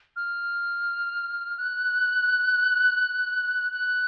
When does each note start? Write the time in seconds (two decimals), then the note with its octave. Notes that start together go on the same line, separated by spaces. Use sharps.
0.16 F6
1.59 F#6
3.72 F#6